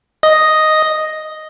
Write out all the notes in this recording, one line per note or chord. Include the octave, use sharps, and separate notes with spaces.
D#5